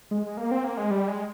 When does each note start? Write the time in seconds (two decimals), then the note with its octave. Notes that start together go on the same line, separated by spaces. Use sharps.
0.11 G#3
0.26 G#3
0.37 A#3
0.51 C4
0.64 A#3
0.77 G#3
0.91 G3
1.08 G#3